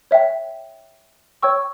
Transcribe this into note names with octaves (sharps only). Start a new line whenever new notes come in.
C#5 E5 G5
C#5 G5 C#6 E6